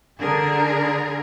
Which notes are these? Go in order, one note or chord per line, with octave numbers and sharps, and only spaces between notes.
D3 G#4 A#4